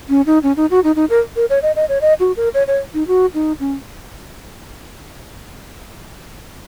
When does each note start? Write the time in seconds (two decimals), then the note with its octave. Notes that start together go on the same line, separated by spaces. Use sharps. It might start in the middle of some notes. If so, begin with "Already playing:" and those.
0.09 C#4
0.26 D#4
0.43 C#4
0.57 D#4
0.71 F#4
0.84 D#4
0.96 D#4
1.10 A#4
1.36 A#4
1.50 C#5
1.62 D#5
1.76 D#5
1.89 C#5
2.01 D#5
2.20 F#4
2.37 A#4
2.54 C#5
2.67 C#5
2.94 D#4
3.07 F#4
3.34 D#4
3.60 C#4